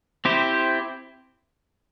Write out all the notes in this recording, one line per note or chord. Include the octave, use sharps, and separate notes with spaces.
C4 E4 G4 C5